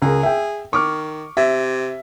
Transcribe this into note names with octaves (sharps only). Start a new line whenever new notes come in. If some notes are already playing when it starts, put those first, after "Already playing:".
C#2 G#4 A#4
E5 G5
D#3 C#6 D6 F6
C3 E5